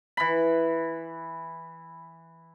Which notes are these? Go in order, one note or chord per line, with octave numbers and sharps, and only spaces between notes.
E3 B5